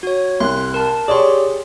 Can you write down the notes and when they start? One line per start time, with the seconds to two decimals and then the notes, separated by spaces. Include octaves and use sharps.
0.03 F#4 C#5
0.40 C2 C6 F#6
0.74 A#4 A5
1.08 G4 G#4 C#5 D5 C6